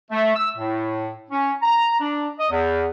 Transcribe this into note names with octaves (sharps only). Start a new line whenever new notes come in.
A3
E6
A2
C#4
A#5
D4
D#5
E2